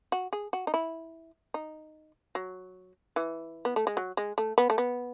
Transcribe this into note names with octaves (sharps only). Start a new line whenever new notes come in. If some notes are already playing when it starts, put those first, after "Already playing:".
F#4
G#4
F#4
D#4
E4
D#4
F#3
E3
B3
A3
G#3
F#3
G#3
A3
B3
A3
B3